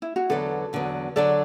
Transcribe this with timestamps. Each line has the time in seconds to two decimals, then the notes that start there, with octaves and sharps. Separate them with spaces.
0.02 E4
0.16 F#4
0.29 E2 D3 F#3 B3 A4
0.73 E2 D3 F#3 B3
1.16 D3 F#3 D4 A4 D5